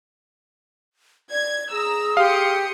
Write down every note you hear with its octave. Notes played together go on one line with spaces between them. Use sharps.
D5 G#6
G#4 A#5 E6
G4 F5 C6 D#6 C#7